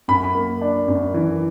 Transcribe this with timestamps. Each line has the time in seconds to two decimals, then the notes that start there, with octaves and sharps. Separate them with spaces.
0.08 F#2 B5
0.35 A#3
0.61 D4
0.88 F#2
1.14 E3